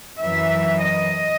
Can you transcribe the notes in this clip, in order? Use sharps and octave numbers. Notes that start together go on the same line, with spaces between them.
F#2 E3 E5
D#5